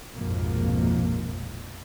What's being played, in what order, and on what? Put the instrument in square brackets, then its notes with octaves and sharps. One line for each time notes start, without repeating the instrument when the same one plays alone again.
[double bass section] A#1 F2 G#2 B2 F3 A#3